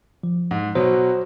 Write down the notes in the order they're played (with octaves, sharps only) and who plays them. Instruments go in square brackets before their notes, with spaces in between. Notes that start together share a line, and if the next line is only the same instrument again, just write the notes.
[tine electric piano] F3
[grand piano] G#2
[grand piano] B2 F#3 [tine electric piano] C5